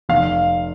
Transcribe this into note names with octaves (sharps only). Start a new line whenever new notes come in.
F1 F5